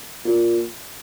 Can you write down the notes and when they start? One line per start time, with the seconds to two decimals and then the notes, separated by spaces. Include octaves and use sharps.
0.25 A#2